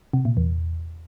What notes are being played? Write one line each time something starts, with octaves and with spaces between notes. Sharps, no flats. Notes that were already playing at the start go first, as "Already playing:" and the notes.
C3
A#2
E2